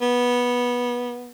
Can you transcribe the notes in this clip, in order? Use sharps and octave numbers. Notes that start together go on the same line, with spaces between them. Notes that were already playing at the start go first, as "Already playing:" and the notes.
B3